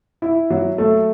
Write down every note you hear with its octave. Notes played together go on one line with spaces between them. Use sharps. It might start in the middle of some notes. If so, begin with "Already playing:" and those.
E4
F#3
A3